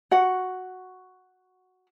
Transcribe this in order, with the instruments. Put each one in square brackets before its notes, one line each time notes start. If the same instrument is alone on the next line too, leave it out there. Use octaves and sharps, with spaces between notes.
[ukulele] F#4 F#5